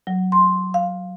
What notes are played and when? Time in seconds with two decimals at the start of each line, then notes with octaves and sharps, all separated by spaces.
0.07 F#3
0.32 C6
0.74 F5